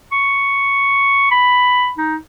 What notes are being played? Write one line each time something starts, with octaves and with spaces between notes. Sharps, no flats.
C#6
B5
D#4